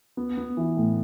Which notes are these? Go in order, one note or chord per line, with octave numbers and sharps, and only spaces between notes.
B3
B3
E3
A2